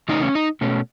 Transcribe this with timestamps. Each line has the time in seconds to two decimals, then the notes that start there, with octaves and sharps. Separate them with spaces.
0.09 C#3 E3 A3 C#4 D#4
0.22 C#4
0.35 D#4
0.61 B2 A3 C#4